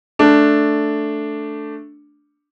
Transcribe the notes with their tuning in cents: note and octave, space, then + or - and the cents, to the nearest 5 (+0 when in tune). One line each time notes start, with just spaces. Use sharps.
A3 +0 D4 +0